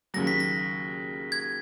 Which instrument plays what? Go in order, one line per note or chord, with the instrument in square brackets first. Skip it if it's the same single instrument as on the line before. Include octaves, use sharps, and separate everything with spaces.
[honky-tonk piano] D#2 C#3 F#3 [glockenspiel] A#6
[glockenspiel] B6
A#6
G#6